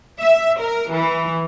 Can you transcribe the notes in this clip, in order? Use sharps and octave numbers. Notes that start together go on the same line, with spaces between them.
E5
A#4
E3